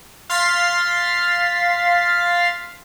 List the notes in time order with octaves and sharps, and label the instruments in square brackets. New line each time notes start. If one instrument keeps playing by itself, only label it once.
[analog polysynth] F5 C6 F6 A6 B6 C7